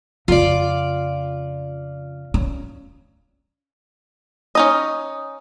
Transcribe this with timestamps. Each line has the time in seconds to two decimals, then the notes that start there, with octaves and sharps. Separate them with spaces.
0.28 F2 C#3 F4 D5
2.34 C#4
4.55 C#4 D#4 D#5